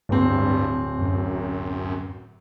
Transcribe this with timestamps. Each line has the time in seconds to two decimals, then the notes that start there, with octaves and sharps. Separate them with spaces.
0.09 D1 G2 C4
0.99 F#2